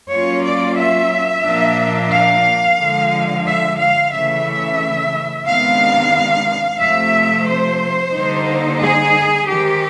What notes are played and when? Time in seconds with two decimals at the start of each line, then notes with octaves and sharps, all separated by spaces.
0.12 F#3 A#3 C#4 F4 C#5
0.44 D5
0.77 E5
1.44 A#2 F3 A#3 D4
2.12 F5
2.79 D3 F3 G#3
3.46 E5
3.80 F5
4.13 C#3 E3 A3 E5
5.46 C3 D#3 G#3 B3 D4 F5
6.81 C3 F3 A3 E5
7.48 C5
8.14 D3 G3 A#3 D#4
8.82 G#4
9.48 D#3 G#3 C4 G4